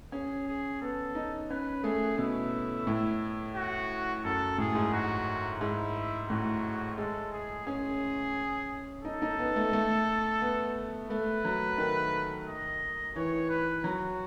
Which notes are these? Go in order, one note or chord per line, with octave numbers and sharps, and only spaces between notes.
C#4 G#4
G#4
B3 A4
D#4
C#4 B4
A3 G#4
B2 E4
A2
F#4
F#2 A4
A2 G#4
G#2
F#4
G#2 E4
A2 F#4
G#3 A4
G#4
C#4 G#4
D#4 A4
D#4
B3
A3
A3
B3
A3 B4
F#3
D#3
D#5
E3 C#5
B4
F#3 F#4